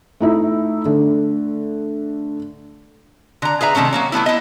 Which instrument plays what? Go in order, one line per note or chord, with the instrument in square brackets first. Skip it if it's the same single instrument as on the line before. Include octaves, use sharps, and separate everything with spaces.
[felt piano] A3 D#4 E4
D3 A3
[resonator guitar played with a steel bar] D3 A#5
G#4 B4 E5 A#5
C3 D#3 A3 C#4 C#5
F#3 A#3 C#5
F#3 A3 B3 E4
E4 D#5